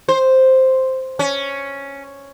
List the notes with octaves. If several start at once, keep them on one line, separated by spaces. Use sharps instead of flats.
C5
C#4